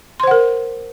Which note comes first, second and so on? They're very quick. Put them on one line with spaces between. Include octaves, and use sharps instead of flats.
C6 C5 F#5 A#4